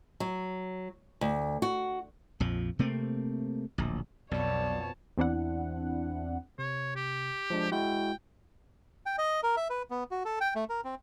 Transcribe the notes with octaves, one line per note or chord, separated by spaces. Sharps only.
F#3
D2
F#4
A#1 F2 F3
C3 A3 A#3 C4
D1 A#1
B1 F2 B2 C#5 D5 A5
E2 C4 D4 E4 F#5
C3 C#5
G4
F3 G#3 D4
G#3 E4 F#4 G5
G5
D#5
A#4
E5
B4
B3
F#4
A4
G5
A3
A#4
C4